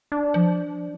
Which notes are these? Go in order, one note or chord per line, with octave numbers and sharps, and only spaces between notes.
D4
F3